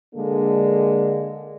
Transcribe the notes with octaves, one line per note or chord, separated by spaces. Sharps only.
D3 G#3 A#3 D4 A4